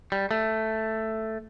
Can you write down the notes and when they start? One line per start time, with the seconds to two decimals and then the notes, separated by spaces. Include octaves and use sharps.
0.12 G3
0.31 A3